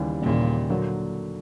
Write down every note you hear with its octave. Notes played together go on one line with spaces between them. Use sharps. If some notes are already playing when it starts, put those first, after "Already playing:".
Already playing: D#2 C#3 E3 G3
D#2 A#2 C#3 E3 G3
D3 F#3 A#3